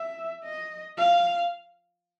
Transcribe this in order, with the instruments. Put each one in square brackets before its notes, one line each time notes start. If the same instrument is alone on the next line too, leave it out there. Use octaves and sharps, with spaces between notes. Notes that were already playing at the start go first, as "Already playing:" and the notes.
Already playing: [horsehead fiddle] E5
D#5
F5